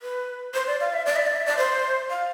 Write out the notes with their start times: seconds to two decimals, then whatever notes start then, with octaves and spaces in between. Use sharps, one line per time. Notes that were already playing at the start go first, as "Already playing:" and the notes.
0.02 B4
0.54 C5
0.67 D5
0.81 F5
0.93 E5
1.06 D5
1.16 E5
1.27 D5
1.36 E5
1.46 D5
1.57 C5
2.10 F5